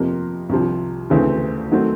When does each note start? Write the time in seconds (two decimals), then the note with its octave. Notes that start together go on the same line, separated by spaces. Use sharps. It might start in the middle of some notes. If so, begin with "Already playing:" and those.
Already playing: F2 C3 F3 A#3
0.49 C2 C3 F3
1.10 D2 C#3 E3 A3 C4
1.72 D#3 F#3 A3 C4